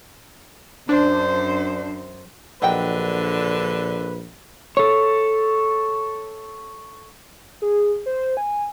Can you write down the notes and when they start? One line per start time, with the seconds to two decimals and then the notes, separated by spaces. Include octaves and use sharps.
0.89 F#2 D4 C5
2.62 A#1 D3 F#3 B4 D#5 G5
4.77 A4 C#5
7.62 G#4
8.06 C5
8.37 G#5